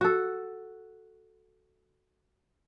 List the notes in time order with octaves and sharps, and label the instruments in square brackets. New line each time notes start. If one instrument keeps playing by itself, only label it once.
[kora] F#4 A4